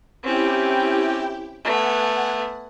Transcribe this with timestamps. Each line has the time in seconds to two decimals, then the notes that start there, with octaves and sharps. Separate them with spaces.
0.24 C4 C#4 E4 G4 G5
1.65 A3 B3 F#5 G#5